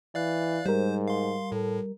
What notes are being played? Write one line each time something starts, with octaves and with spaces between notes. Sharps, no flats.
E3 D5 F5 F#6
G#2 G3 A#4 C5
F5 C6
A2 A4